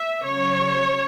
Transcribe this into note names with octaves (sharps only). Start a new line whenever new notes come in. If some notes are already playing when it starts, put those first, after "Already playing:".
Already playing: E5
C#3 F#3 C#5